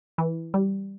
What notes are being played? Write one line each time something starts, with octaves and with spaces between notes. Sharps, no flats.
E3
G3